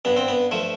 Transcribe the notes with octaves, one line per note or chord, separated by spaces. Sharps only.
G2 B3
C4
B3
F3 A3